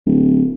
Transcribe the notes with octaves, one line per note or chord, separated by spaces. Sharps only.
D1